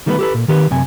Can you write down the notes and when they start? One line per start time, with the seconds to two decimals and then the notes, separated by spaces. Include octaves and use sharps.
0.06 D#3 G3 A3 B3 E4 B4
0.19 G4 A4 B4
0.34 A#2
0.48 D#3 G4 B4
0.71 F#2 C3 G#5